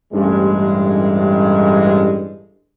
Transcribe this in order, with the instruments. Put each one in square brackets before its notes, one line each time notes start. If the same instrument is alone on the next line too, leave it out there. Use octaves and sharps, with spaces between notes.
[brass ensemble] A1 G2 G#3